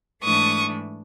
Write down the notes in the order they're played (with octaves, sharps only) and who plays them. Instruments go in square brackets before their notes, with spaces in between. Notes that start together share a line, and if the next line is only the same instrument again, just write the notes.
[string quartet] G#2 E3 A3 D4 C#6 D#6